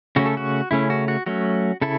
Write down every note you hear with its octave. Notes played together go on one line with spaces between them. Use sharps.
C#3 A3 C#4 F#4
A4
F#4
C#3 A3 C#4 E4
F#4
F#4
F#3 A3 C#4 F#4
C#3 E4 A4